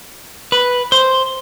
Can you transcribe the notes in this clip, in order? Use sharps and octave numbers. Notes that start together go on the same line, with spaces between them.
B4
C5